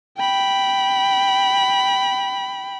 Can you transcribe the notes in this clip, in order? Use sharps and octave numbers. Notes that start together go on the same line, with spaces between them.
G5 B5